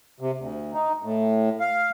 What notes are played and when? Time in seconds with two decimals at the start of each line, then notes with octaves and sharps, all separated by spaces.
0.20 C3
0.38 D2
0.74 D#4
1.03 A2
1.60 F5